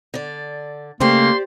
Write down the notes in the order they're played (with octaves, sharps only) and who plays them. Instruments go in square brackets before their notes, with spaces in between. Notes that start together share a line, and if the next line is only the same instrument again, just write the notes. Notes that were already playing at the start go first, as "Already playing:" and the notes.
[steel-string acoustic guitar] D3 D5
[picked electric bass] C#3 A3 [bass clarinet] A#3 [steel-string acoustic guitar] G4 C5 D5 [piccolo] C6